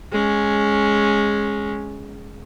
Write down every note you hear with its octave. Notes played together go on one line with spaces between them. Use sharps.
G#3 C#4